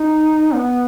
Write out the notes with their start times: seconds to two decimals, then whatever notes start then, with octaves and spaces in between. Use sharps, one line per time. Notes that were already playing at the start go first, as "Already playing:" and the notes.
Already playing: D#4
0.53 B3